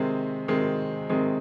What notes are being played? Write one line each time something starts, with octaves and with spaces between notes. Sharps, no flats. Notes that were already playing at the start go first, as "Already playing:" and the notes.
Already playing: C3 D#3 G#3 C4
C3 D#3 G#3 C4
C3 D#3 G#3 C4